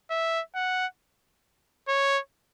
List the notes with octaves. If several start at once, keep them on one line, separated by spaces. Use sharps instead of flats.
E5
F#5
C#5